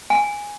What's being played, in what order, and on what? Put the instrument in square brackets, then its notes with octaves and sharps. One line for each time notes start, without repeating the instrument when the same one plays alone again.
[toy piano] G#5